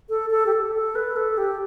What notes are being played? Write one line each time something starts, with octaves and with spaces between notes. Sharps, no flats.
A4
A4
G4
A4
A4
B4
A4
G4